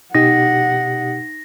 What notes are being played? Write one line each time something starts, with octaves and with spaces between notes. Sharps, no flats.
B2 D#4 G4 F#5 A#6